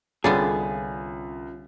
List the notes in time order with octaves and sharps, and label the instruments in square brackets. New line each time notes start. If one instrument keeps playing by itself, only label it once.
[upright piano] C2 A6 [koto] D3 G3 B3 [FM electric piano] C#4 F4 [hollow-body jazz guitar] G#4